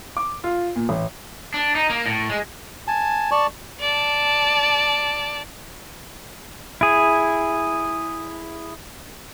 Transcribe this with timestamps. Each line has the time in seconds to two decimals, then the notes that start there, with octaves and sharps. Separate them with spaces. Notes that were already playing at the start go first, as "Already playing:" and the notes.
0.17 D6
0.44 F4
0.76 A#2
0.89 A1
1.54 D4
1.75 D#4
1.90 A#3
2.06 A2
2.30 G#3
2.88 G#5 A5
3.32 D5 A5 C#6
3.80 D5 A5
6.81 E4 G#4